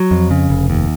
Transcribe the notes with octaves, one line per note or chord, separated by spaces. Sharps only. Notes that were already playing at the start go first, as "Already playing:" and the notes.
Already playing: F#3
F2
C#3
F1
D#2